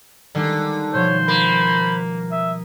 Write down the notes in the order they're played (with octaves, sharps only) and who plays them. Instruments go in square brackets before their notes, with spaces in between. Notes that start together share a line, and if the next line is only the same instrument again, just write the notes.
[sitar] D3 [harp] D#3 G3 G#3
[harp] B2 F3 [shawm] C5 [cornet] C#5
[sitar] A#3 [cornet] B5
[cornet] E5 [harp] D#6 B6 D#7